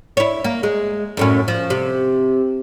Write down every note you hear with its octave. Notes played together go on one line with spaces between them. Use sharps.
E4 C#5
A#3
G#3
F#2 A2 C#4
F3
C3